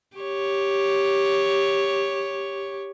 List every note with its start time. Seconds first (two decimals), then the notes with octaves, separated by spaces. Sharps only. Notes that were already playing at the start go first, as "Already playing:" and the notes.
0.17 G4 C#5